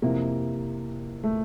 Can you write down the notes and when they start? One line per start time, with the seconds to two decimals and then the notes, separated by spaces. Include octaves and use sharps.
0.02 F2 C3 E3 A#3
1.24 A3